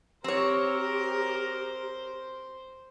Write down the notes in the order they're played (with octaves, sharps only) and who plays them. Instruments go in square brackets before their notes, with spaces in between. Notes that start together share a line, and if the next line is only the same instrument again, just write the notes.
[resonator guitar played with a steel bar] C4 C#5 [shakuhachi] G4 [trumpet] A#4 [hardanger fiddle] C5